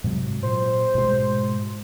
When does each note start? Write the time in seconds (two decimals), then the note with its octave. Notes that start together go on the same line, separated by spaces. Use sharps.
0.04 G#2 C3 F#3
0.43 A#2 C5
0.95 G#2 B2 G#3